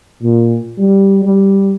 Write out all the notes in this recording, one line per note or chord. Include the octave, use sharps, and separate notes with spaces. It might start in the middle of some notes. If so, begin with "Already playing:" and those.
A#2
G3
G3